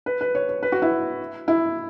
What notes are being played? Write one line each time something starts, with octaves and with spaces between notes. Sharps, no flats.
B4
B4
C#5
C#5
B4
F#4
E4
E4